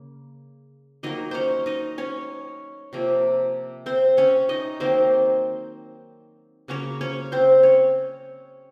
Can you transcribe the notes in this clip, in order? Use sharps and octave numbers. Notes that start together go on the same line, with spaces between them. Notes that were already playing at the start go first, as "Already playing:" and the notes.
Already playing: C#3 A#3
D#3 F#3 A#3 D#4 D#5
C#4 C5 C#5
D#4 D#5
C#4 C#5
C3 F3 A#3
C4 C5
C#4 C#5
D#4 D#5
D#3 F#3 A#3 C4 C5
C#3 F#3 A#3 C#4 C#5
C#4 C#5
C4 C5
C#4 C#5